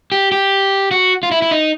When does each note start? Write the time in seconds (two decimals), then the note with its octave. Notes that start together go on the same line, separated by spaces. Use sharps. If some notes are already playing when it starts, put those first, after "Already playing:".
0.12 G4
0.32 G4
0.91 F#4
1.23 F4
1.31 E4
1.42 E4
1.51 D#4